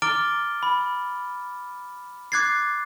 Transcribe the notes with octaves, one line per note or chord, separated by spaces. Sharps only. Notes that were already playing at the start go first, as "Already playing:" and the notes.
A#5 D6 F6 A6 D7 G7
B5
D6 F#6 G#6 A6 C7